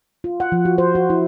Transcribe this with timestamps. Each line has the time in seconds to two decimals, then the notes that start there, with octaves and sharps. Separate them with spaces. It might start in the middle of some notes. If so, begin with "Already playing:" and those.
0.24 F4
0.40 F#5
0.52 F3
0.65 F#4
0.78 C5
0.95 F#4
1.10 E4